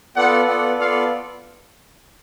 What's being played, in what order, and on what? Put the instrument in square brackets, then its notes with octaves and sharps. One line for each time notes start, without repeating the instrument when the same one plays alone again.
[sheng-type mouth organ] B3 F4 A4 D5 [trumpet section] F#5
[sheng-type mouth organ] B3 F4 A4 D5 [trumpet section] F#5
[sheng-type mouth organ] B3 F4 A4 D5 [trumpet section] F5